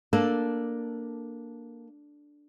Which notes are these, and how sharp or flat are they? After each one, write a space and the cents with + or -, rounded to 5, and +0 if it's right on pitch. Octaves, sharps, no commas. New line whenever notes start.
A#3 +0 D4 +0 A4 +0